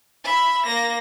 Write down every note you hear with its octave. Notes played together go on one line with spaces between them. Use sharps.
E5 B5
A#3 A#6